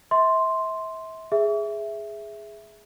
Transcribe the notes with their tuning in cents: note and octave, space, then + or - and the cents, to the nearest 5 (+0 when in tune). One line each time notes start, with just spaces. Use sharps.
E5 -35 C6 +0
G#4 +0 E5 +0